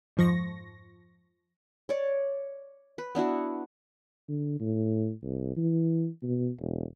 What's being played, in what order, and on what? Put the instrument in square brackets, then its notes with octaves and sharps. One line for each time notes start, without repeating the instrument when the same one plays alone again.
[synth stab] F2 G#2 F3 C#6 A#6
[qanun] C#5 D5
B4
B3 D4 E4 F#4
[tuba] D3
A2
C2
E3
B2
E1